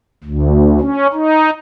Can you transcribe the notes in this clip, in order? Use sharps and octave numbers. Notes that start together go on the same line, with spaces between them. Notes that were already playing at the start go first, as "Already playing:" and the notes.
D2
C#4
D#4